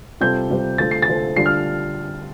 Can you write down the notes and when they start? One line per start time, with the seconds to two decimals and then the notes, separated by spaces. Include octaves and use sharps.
0.21 C3 G3 F4 A4 C5 G6
0.50 C3 G3 F4 A4 C5
0.78 D3 A3 F4 A4 C5 A6
0.91 C7
1.02 A6
1.08 D3 A3 F4 A4 C5
1.36 D3 G3 D4 F4 C7
1.46 F6